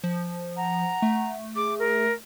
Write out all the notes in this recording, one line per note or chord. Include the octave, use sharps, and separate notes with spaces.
F3
F#5 A#5
A3
G#4 D6
A#4